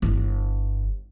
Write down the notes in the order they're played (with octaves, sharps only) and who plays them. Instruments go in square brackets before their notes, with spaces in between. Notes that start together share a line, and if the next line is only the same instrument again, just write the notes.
[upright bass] G1 E4